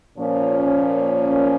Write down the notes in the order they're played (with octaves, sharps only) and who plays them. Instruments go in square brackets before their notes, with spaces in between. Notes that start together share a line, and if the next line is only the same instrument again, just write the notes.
[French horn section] A#2 F3 A#3 C#4